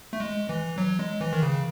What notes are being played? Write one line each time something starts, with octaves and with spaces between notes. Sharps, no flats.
A3
G#3
E3
F#3
G#3
E3
D#3
C#3